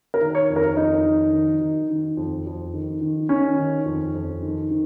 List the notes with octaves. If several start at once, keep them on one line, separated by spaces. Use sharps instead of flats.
A#4
D#3
C#5
F2
A#4
F2 D#4
D#3
D#3
D#3
D#3
F2
F2
D#3
D#3
D#3 C#4
D#3
F2
F2
D#3
D#3